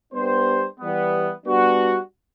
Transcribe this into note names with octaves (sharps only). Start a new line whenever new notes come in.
G3 B3 D4 G4 C5
E3 G3 B3
G3 B3 D4 F#4